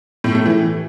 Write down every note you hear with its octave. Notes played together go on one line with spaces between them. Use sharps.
A2
A3
E3